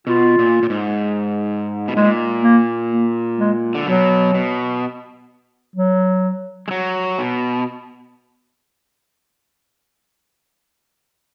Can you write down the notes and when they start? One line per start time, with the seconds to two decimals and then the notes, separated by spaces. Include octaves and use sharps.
0.07 B2 F4
0.39 A#2
0.63 A#2
0.70 G#2
1.88 B2
1.96 A#2 G#3
2.44 A#3
2.92 A#3
3.39 G#3
3.75 D3
3.86 B2 F#3
4.34 B2
5.76 F#3
6.68 G#3
6.71 F#3
7.19 B2